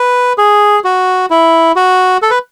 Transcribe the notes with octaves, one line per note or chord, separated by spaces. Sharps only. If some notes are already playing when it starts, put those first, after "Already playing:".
Already playing: B4
G#4
F#4
E4
F#4
A4
B4